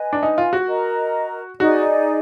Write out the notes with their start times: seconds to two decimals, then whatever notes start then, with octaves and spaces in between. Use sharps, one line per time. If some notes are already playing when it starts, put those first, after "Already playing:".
Already playing: B4 D#5 G#5
0.13 D4
0.23 D#4
0.38 F4
0.53 F#4
0.68 A#4 D#5 A#5
1.60 D#4 F#4 G#4 D5